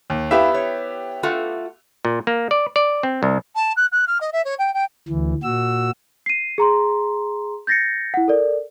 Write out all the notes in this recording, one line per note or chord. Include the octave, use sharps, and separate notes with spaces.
D#2
B3 E4 G4 E5 F5
C#5
A3 F4 F#4
A#2
A#3
D5
D5
C4
C2
A5
F#6
F#6
F6
D#5
E5
C#5
G5
G5
D2 E3
A#2 F#4 E6
C7 D#7
G#4 A#5 C6
G6 A6 A#6 C7 C#7
E4 F#5
A4 A#4 D5